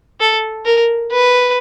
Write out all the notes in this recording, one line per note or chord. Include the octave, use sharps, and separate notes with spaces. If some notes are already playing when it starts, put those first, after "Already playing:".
A4
A#4
B4